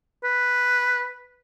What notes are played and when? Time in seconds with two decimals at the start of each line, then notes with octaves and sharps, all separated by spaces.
0.24 B4